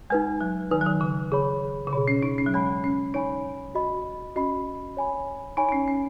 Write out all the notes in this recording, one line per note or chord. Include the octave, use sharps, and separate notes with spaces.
G#3 D#4 B4 G#5
F#3
D#3 D#4 B4 G#5
F#3
D#3
C#3
C#3 G#4 C#5 B5
C#3
B2 G#4 C#5 B5
C#4
D#4
C#4
F#3
G#3 C#5 G#5 B5
C#4
D#4 C#5 G#5 B5
F#4 D#5 B5
C#4 F#4 D#5 B5
C#5 G#5 B5
D#4 C#5 G#5 B5
D#4
C#4
C#4